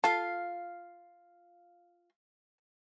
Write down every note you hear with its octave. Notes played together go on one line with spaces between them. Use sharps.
F4 A4 F5